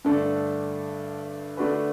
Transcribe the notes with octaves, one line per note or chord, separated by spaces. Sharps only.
G2 D3 A3 D4 A4
D3 A3 D4 F#4 B4